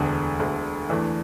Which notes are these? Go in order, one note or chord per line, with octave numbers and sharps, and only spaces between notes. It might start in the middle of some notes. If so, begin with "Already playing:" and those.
Already playing: E1 D2 D3
E1 D2 D3
E2 E3 A3 D4